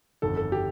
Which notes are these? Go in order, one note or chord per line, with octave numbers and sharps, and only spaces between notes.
G1 F2 D#3 A4
A4
G4